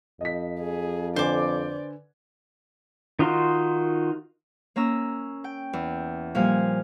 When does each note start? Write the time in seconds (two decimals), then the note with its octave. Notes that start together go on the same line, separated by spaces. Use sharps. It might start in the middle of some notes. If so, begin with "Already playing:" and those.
0.21 F2 D#5 B6
0.59 G#4
1.16 D3 B4 C5 D5 G#5 D6
3.19 D#3 D#4 F4 F#4 C6
4.76 A#3 C#4 A#5 E6
5.44 G5
5.73 E2
6.35 A#2 F3 G3 F5 G#5